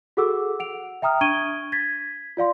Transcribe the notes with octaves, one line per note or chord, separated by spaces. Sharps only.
F#4 G#4 A4 F#5 D6 E6
F#5 D7 F7
E5 G5 A#5 D#6 F6
D4 C#6 G#6 D7 D#7 G7
G#6 A6 B6
F4 D5 F5 C6